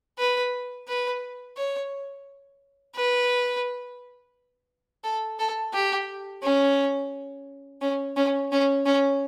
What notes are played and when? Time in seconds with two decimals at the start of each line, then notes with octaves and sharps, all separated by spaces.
0.18 B4
0.88 B4
1.57 C#5
2.95 B4
5.04 A4
5.39 A4
5.73 G4
6.43 C#4
7.81 C#4
8.16 C#4
8.52 C#4
8.85 C#4